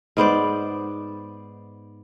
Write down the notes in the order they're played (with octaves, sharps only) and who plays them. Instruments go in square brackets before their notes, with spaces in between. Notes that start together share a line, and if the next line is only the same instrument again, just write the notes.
[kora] G#2 B3 C5 D5